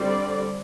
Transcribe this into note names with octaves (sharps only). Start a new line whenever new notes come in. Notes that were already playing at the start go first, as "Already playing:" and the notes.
Already playing: D3 G3 C4 D5